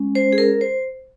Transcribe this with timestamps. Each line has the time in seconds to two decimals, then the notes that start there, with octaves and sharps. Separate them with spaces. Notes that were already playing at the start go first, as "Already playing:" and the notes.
Already playing: G#3 C#4
0.15 C5
0.33 G#4
0.38 A#4
0.61 C5